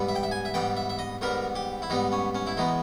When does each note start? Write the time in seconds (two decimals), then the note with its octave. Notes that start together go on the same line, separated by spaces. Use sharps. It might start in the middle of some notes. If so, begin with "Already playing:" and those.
Already playing: G#2 G3 B3
0.09 E5
0.16 G5
0.23 E5
0.31 G#5
0.45 E5
0.54 G#2 G3 B3 G5
0.77 E5
0.90 E5
0.99 D#5
1.21 G#2 G3 B3 A#4
1.55 G4
1.82 E4
1.90 G#2 G3 B3 D#4
2.12 C#4
2.35 C#4
2.47 E4
2.57 E2 B2 G#3 B3 D#4